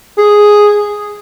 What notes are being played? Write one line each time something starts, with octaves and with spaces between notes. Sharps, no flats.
G#4